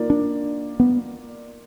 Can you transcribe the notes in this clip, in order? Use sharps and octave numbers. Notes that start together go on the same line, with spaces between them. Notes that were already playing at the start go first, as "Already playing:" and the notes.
Already playing: D#3 A#3 F4 A#4 D5
D4
B3